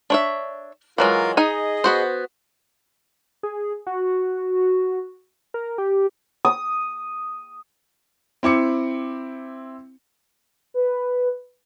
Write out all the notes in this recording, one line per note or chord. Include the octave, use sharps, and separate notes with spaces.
D4 C#5 E5
E3 F#3 G#3 F4 A#4 F5
D#4 G#4 D#5 G#5
B3 F#4 C5
G#4
F#4
A#4
G4
D#6
C4 E4 D6 C#7
B4